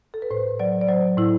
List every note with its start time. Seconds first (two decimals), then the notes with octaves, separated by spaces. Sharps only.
0.14 A4
0.22 B4
0.31 A2 C5
0.59 F#3 D5
0.81 D5
0.88 F#3 C5
1.17 A2 E4